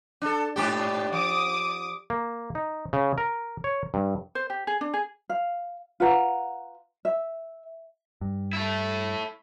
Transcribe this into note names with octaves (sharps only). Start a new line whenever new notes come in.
D4 A4
G#2 D4 G4
F3 D6 D#6
A#3
D#4
C#3
A#4
C#5
G2
C5
G4
G#4
D4
G#4
F5
F4 B4 F#5 A#5
E5
G2
A3 E4